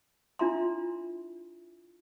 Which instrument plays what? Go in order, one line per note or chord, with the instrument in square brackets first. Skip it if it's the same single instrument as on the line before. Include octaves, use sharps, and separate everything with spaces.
[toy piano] D4 E4 F4 E5 A#5 C6